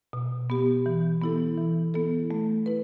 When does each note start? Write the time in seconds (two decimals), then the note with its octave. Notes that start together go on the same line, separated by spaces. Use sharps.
0.13 B2
0.50 B3 G4
0.86 E3
1.22 B3 E4 A4
1.58 E3
1.94 B3 E4 A4
2.31 A3
2.66 E4 B4